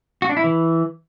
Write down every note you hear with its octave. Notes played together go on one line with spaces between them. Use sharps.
F#4
D4
E4
E3